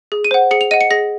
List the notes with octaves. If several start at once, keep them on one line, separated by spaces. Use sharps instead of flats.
G#4
D#7
C5 F#5
G#4 C#7
F7
D#5 F#5 D#7
C#7
G#4 A#6